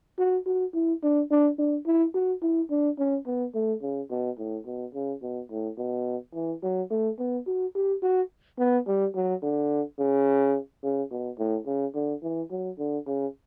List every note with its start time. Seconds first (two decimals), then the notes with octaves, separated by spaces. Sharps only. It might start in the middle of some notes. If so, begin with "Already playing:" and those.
0.19 F#4
0.46 F#4
0.74 E4
1.03 D4
1.31 D4
1.58 D4
1.86 E4
2.14 F#4
2.42 E4
2.70 D4
2.99 C#4
3.26 B3
3.54 A3
3.82 C#3
4.11 B2
4.38 A2
4.66 B2
4.94 C#3
5.22 B2
5.51 A2
5.78 B2
6.34 E3
6.63 F#3
6.90 A3
7.19 B3
7.47 F#4
7.75 G4
8.02 F#4
8.59 B3
8.87 G3
9.15 F#3
9.42 D3
9.99 C#3
10.83 C#3
11.11 B2
11.39 A2
11.67 C#3
11.95 D3
12.22 E3
12.51 F#3
12.79 D3
13.07 C#3